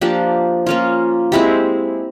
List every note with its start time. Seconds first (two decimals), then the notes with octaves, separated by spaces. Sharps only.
0.01 F3 A#3 D4 G4
0.66 A#3 C#4 F4
1.32 G#3 C4 E4 G4